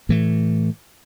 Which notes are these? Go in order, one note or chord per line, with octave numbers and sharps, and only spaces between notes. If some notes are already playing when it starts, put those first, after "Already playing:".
A2 E3 A3